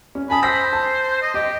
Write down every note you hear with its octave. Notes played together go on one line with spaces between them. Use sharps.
C#4
G#5 A5 B5 D#6
C5 E6 A#6 B6
A5
D#5
G4 D#5